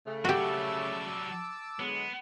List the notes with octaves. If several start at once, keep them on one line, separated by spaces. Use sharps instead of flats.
C#3 A3
F#3 G3 F#4 G4 A5 D6 E6
D3 F#3 G#3 B3